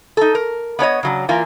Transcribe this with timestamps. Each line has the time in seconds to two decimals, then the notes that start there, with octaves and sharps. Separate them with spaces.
0.17 D#4 A4
0.35 A#4
0.79 B3 D4 C#5 D#5
1.03 C#3 F#3 D4
1.29 E3 A#3 F4